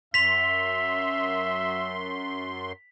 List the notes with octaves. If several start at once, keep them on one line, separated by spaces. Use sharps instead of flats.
F#2 E5 C6 B6 F7